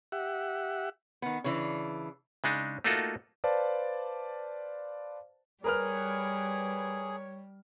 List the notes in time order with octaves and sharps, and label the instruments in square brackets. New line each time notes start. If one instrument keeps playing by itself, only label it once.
[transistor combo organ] G4 E5 F#5
[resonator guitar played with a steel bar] D#3 B3
C#3 E3 D4
[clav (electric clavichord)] C#3 G#3 D4 D#4
A3 A#3 D#4 F4 F#4 A4
[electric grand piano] B4 C5 D5 F5 A5
[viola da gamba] G3 [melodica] G#4 [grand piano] A#4 B4 F6 [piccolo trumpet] C#5